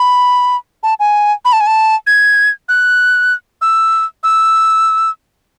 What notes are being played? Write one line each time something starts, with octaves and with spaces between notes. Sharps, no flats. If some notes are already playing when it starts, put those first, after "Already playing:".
Already playing: B5
A5
G#5
B5
A5
G#5
A5
G#6
F#6
E6
E6